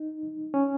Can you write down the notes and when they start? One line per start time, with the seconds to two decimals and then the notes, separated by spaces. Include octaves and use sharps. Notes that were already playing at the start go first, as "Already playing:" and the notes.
Already playing: D#4
0.54 C#4